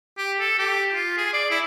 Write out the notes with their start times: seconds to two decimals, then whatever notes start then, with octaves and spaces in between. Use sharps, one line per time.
0.18 G4
0.40 A4
0.58 G4
0.94 F4
1.17 G#4
1.33 D5
1.51 E4